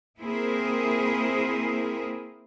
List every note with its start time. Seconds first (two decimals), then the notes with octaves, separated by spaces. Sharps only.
0.18 A#3 C4 E4 G#4 A#4 C5